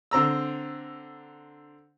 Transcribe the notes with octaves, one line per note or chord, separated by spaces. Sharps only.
D3 C4 A#5 E6